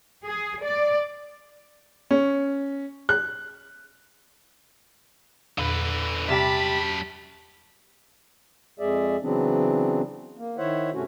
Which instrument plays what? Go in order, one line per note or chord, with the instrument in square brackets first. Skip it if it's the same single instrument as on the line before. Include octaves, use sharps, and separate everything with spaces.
[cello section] G#4
D5
[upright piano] C#4
F#6
[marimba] E2 A#2 B5 [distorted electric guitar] D3 B4
[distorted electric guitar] F#2 A5 [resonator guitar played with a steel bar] C3 G3 G4 [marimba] E5 [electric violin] B5 B6
[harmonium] F2 G#3 G#4 D5 E5
C#3 E3 F#3 B3 C4 D4
A#3
D#3 E4 C5 C#5 E5 F#5
G2 C3 A3 C#4 F#4